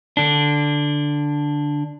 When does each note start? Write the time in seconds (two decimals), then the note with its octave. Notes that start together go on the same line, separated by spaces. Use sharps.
0.17 D3 D4